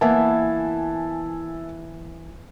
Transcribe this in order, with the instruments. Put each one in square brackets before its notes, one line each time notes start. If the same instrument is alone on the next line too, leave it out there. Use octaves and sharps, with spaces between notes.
[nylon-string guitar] E3 A#3 B3 [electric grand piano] E5 G#5 A5